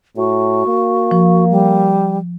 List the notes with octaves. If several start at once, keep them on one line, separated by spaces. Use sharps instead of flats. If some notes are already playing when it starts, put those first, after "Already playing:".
A2 F#4
A#3
F3
G3